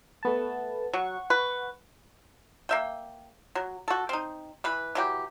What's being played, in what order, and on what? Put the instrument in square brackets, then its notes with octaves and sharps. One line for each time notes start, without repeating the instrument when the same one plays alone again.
[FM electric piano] A3 B3 A5
[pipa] F#3 [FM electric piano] F#5 C#6
[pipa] B4
A#3 E5 G5
F#3
F#4 A4
C4 D#4
E3 B4
E3 F#3 G4